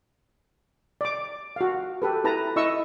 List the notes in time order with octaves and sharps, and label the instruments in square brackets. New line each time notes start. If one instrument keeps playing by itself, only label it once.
[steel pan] D5 D6
F#4 F5
G4 A4 B4
E4 B4 A5 A#5
E4 D#5 C#6 E6